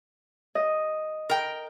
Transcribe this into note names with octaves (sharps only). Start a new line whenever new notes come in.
D#5
A#4 G5